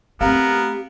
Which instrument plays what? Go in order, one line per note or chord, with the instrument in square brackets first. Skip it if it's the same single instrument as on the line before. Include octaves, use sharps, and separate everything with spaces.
[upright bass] A3 C4 [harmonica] B3 A#4 [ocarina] G4 [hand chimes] F5 A#5